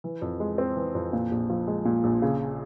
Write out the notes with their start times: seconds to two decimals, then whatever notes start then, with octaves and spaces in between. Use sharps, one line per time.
0.04 E3
0.22 F2
0.40 G#3
0.58 C4
0.76 E3
0.95 F2
1.13 A#2
1.31 A#1
1.50 F3
1.67 G#3
1.85 A#2
2.04 A#1
2.22 C#3